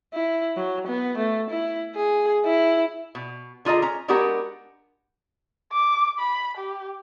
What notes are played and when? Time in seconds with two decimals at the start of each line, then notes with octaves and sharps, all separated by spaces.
0.13 E4
0.57 F#3
0.87 B3
1.17 A3
1.50 E4
1.95 G#4
2.45 E4
3.15 B2
3.65 D3 F4 G#4 D#5 A#5
3.82 C#4 A#5
4.08 G#3 B3 D4 F#4 G4 A#4
5.72 D6
6.19 B5
6.57 G4